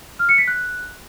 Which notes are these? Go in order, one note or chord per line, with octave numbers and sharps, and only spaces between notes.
F6
C#7
B6
F#6